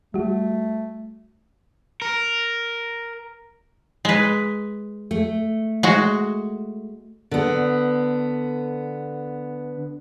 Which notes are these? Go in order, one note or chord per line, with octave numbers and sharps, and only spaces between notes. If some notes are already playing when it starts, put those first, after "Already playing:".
G3 A3 F#4
A#4
G#3 B4
A3
G#3 F#4
D3 B3